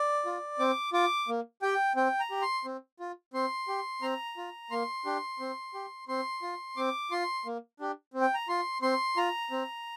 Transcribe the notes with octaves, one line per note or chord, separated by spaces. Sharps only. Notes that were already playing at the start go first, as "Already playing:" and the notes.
Already playing: D5
F4
C4 D6
F4 D6
A#3
G4 G5
C4 G5
A#5
G4
C6
C4
F4
C4 C6
G4
C4 A#5
F4
A#3 C6
D4 G4
C4
G4
C4 C6
F4
C4 D6
F4 C6
A#3
D4 G4
C4
G5
A#5
F4 C6
C4 C6
F4 A#5
C4